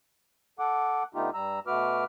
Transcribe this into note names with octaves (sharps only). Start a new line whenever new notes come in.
A4 F#5 D6
D3 A3 B3 D#4 F4 G4
G2 G3 A#5 E6
B2 A3 F#4 B4 D6 F6